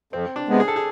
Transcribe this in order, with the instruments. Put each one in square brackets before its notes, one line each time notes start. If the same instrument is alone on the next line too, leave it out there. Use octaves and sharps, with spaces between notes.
[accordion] F2 [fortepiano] C4
[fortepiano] D4
[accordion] C3 G#3 B3
[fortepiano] G#4
A4
G#4